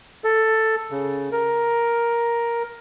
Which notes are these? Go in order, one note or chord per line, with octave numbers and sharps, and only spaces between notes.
A4
C#3
A#4